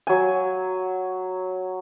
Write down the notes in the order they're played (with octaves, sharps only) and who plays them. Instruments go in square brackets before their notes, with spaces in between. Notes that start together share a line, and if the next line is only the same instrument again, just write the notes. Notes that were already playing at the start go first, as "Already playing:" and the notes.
[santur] F#3 G#5